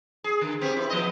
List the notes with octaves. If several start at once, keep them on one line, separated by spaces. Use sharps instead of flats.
G#4
D3
B3 C4 G4
E4
F3 B3 D#5